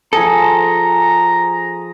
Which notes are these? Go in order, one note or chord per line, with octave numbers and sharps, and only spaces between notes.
F3 G#4 A4 A#5